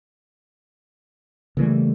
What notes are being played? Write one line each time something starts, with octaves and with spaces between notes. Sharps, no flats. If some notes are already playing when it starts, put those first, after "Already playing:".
C#3 E3 G3 A3 A#3